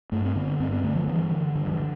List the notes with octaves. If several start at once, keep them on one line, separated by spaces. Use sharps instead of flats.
G2 A3
C4
D3 B3
G2 C4
B3
D3 A3
F3
G2 E3
D3
G2 D3
F3
E3
D3